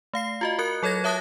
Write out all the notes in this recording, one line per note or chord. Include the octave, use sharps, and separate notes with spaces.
A3 F5 C7
F4 F#4 D#5
F#4 A#4 F#6 C#7
F#3 A4 C#5 G#6 A#6
C#5 E5 A5 D#6 F#6 A#6